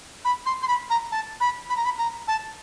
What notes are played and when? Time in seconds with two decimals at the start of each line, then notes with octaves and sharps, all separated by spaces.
0.25 B5
0.46 C6
0.62 C6
0.68 B5
0.90 A#5
1.12 A5
1.40 B5
1.70 B5
1.77 A#5
1.85 B5
1.99 A#5
2.28 A5